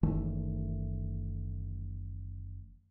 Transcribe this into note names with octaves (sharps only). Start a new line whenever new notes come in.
F#1 D#3 E3 A3